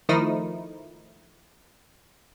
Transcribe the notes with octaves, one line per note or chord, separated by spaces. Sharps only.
D#3 F3 A3 D#4 E4